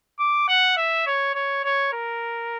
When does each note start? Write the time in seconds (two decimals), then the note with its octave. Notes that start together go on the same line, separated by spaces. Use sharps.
0.19 D6
0.48 F#5
0.77 E5
1.06 C#5
1.35 C#5
1.64 C#5
1.93 A#4